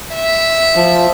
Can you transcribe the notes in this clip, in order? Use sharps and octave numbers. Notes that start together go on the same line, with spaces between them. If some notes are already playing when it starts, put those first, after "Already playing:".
E5
F3